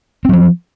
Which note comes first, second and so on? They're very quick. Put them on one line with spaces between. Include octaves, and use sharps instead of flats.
C4 F#3 F3